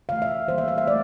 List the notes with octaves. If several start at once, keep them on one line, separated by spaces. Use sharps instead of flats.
C3 E3 A3 F5
E5
E3 G3 A#3 C5
E5
F5
E5
A3 D5